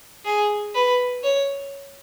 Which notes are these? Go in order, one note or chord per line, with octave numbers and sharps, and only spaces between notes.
G#4
B4
C#5